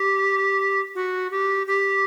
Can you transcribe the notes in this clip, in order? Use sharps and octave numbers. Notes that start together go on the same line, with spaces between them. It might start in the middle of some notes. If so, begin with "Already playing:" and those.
Already playing: G4
F#4
G4
G4